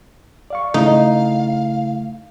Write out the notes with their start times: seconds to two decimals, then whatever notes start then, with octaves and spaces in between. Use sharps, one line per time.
0.50 D5 F5 C#6
0.74 C#3 A3 D#4 E4 F5